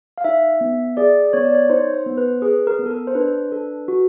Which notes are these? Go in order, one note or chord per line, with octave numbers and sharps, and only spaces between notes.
F5
D#4 E5
B3
G#4 D5
B3 C#5
D5
C#5
D#4 C5
C5
B3
B4
G#4 B4
A#4
B3
A4
A#4
C5
D4 B4
A4
F#4